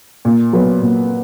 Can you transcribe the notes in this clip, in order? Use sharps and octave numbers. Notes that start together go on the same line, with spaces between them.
A#2
F#3 B3
A#2